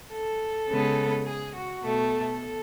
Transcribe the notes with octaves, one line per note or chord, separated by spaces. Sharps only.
A4
C#3 G#3 B3
G#4
F#4
B2 A3
A4